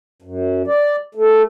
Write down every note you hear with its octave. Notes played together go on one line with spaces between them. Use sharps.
F#2
D5
A3